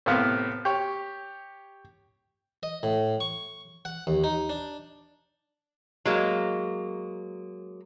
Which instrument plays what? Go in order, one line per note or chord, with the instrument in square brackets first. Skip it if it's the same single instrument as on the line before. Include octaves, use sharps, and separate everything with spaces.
[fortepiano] A2 C3 A#3 B3 F5
G4 C#5
[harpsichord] D#5
A2
C#6
F#5
D#2
D#4
D4
[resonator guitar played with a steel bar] F#3 G#3 A#3